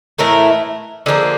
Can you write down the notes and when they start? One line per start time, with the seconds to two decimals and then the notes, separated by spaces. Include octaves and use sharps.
0.18 A2 E3 A3 A#4
1.06 D3 F3 A#3 G#4